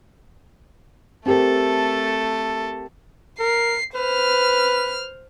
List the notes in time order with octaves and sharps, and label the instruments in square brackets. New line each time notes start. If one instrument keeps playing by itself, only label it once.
[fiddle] A3 A4 [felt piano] C4 G4 A#4
[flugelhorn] A#4 [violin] C7
[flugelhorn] B4 [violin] C5 F6